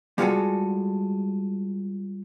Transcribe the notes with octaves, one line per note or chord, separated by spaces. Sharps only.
G3 G#3 F4 F#4 G#4 A4